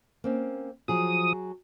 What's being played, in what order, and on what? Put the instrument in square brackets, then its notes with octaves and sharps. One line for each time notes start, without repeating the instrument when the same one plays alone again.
[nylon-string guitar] A#3 C4 C#4
[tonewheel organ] F3 D#6 [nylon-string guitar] F#3 G#4